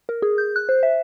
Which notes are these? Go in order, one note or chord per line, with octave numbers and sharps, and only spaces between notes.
A#4
G#4
G6
F#6
C5
E5